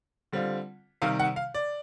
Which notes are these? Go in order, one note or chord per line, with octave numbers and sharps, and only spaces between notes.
D3 G3 C4 F4
C3 D#3 G3 F5
F#5
F5
D5